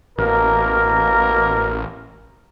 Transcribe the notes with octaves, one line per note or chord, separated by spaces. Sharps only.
A1 B2 A#3 A#4